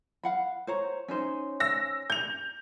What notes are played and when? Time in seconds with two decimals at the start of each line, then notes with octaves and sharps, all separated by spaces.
0.24 F5 F#5 B5
0.67 C5 C#5 A#5
1.08 C#4 D#4 C5
1.60 E6 A#6
2.10 G6 F7